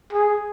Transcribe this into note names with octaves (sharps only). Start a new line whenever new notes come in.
G#4